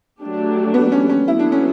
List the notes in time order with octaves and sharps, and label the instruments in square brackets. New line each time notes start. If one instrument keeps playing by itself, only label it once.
[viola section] F#3 A3 D4 G4
[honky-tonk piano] B3
C#4
C#4
[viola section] D3 F#3 B3 [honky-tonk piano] E4
[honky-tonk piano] D4
C#4